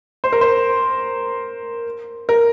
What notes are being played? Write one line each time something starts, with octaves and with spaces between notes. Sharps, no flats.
C5
A#4
C5
A#4